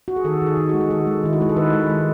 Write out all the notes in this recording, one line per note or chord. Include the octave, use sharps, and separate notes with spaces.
F#4
G#4
D#3 A4
D#3
G#4
D#3
F#4
G#3
G#4
D#3 A4
G#3
D#3 E4
F#4
G#3 G#4
A4
D#3 B4
G#3
G#3